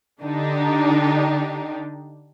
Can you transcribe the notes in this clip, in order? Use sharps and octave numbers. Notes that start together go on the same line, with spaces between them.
D3 D4 D#4 G4